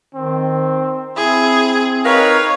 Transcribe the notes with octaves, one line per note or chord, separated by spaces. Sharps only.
D#3 C4
C4 E4 G#4
D#4 A#4 B4 C#5 F5